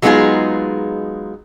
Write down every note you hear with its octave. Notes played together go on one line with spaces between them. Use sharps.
F#3 G#3 B3 D#4 F4 G#4